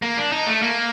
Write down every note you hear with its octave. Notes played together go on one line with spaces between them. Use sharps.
A#3
D4
D#4
A3
A#3